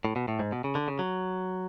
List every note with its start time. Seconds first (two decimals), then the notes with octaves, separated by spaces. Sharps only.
0.05 A2
0.16 B2
0.28 A2
0.39 G#2
0.52 B2
0.64 C#3
0.75 D3
0.88 C#3
0.99 F#3